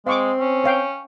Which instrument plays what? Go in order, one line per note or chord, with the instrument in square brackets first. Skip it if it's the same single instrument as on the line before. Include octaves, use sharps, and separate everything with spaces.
[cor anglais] G#3 [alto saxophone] C4 [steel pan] F5 C#6 D6
[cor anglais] C#4
[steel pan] C#5 F5 G5